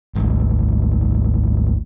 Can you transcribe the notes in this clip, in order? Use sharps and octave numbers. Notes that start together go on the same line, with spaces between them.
G#1 D2